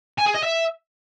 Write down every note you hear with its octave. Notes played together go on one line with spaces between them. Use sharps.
G#5
G#4
D#5
E5